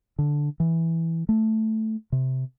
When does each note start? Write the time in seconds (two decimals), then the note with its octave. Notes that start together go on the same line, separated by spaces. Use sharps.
0.19 D3
0.60 E3
1.29 A3
2.12 C3